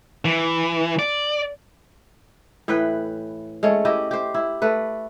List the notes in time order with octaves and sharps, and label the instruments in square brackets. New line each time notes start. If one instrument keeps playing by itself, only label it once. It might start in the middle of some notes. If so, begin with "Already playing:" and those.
[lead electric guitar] E3
D5
[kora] A2 E3 B4 G5
G#3 A3 C#4
E4 G4 D#5
G4 C5
E4
A3 B4